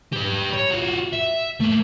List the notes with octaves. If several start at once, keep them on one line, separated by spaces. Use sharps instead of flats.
G4 B4
C#5
F4 F#4
E5
A3 A#3